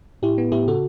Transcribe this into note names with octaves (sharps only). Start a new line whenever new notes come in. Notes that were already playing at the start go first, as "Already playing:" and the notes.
A2 E4 G4
B3
A2 E4 G4
C#3 F#4 A4